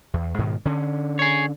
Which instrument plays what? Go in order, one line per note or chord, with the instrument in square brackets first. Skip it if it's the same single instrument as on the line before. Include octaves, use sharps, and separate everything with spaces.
[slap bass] E2
G#2 B2 D#3
D3 C#4
[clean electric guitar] G#4 C#5